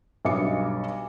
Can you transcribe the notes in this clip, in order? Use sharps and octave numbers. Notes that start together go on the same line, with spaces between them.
B1 G2 D#5 D6 C#7